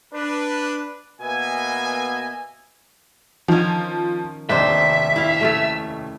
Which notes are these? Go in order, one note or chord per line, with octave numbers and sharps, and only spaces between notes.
D4 B4
B2 A#3 B3 D#5 E5 G#5
D#3 F3 C#4
F1 D#2 D4 D#4 C5 E5
E4 F5
A3 C#4 A4